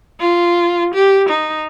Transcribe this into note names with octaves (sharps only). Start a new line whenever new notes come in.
F4
G4
D#4